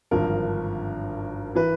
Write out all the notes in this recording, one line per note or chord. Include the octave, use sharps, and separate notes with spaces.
G#1 G2 D3 F3 A#4
E3 B4